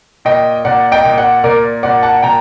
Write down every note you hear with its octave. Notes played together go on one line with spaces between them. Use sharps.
A#2 D#5 G5
A#2 D5 F#5
D#5 G5
A#2
D5 F#5
A#2 A#4 D5
A#2 D5 F#5
F#5 A5
A#2 G5 A#5